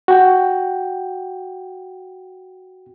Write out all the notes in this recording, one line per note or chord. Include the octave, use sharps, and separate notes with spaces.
F#4 G5